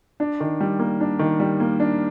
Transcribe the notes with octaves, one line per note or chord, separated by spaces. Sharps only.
D4
D#3
G3
A#3
D4
D#3
G3
A#3
D4